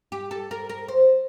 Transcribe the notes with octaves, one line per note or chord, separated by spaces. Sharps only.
G4
A4
A#4
A#4
C5